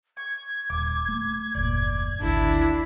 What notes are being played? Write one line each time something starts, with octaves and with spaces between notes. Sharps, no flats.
C#6 G#6
D#1 D6
A3
F#1 D#2 A#2 D5
G#1 D2 D4 E4 A4